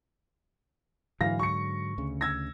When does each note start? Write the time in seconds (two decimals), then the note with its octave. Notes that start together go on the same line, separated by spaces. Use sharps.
1.21 G#2 D3 E3 F#3 F5 A#6
1.39 C#6 C#7
1.98 D2 C#3
2.21 E6 G#6 A#6